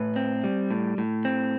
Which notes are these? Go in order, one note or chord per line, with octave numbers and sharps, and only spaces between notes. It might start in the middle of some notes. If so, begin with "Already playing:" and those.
Already playing: A2 B4
C4
G3
A2
A2
C4